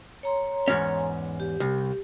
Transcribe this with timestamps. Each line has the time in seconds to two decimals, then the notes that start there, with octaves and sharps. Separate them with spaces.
0.23 C#5 A#5 C6
0.68 E2 G#2 C#4
1.40 G4
1.60 C2